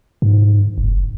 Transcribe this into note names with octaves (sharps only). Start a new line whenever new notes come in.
G#2
F#1